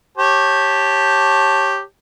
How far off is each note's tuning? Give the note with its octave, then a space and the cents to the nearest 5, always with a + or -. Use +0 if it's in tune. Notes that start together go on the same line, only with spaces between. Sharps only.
G4 +0 C#5 -20 A5 +5